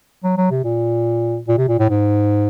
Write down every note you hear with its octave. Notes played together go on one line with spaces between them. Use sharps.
F#3
F#3
C3
A#2
A#2
C3
A#2
A2
G#2